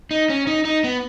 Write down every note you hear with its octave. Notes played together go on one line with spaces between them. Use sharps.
D#4
C#4
D#4
D#4
B3